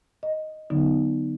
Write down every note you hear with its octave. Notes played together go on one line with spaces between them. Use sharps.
D#5
D3 F#3 B3 D#4